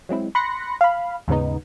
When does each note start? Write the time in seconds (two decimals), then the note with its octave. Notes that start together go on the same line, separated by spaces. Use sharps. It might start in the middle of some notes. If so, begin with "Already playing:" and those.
0.09 F#3 G#3 C4 E4
0.35 B5 C6 F#6 A#6 C#7
0.81 F5 B5
1.28 D#2 G#2 C#3 B3 D#4